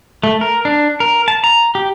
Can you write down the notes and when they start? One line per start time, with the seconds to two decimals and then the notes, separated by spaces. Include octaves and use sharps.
0.24 A3
0.41 A#4
0.65 D4
1.00 A#4
1.28 A5
1.44 A#5
1.75 G4